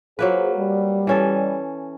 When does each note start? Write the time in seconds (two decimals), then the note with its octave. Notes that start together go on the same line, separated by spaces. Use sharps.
0.19 F#3 A#3 F4 G#4 B4 C5
0.58 G3
1.07 E3 C#4 A4